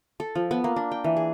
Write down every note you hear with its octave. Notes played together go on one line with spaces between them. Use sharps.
A4
F3
B3
A#3
D4
G5
E3
G#4